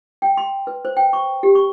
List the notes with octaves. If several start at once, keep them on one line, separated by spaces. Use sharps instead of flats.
G5
C6
B4
C5
G5
C#6
G4
C#6